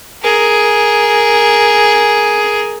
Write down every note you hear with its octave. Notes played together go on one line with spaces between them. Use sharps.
G#4 A#4